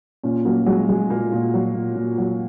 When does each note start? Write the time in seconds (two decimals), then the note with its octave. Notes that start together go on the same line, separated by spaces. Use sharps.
0.24 A#2 C#4
0.45 F#3 A#3
0.66 F#3 G#3
0.88 F#3 G#3
1.10 A#2 A#3
1.32 A#2
1.54 F#3
1.74 A#2
1.96 A#2
2.18 F#3